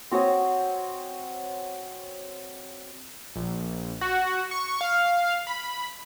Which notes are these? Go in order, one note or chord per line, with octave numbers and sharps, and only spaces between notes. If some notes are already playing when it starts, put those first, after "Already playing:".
C4 F#4 C#5 D#6
A#1
F#4
C#6
F5
B5